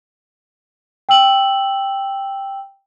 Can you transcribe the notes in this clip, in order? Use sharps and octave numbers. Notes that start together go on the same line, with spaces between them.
G5 E6 F#7